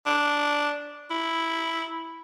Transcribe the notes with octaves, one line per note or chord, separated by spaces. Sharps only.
D4
E4